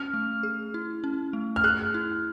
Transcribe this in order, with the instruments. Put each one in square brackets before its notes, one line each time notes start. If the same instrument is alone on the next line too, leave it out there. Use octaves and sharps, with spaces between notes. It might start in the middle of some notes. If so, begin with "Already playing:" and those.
Already playing: [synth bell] C#4 [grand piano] F6
[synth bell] A3
G#4
E4
C#4
A3
[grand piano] F6
[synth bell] G#4 [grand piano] F#6
[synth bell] E4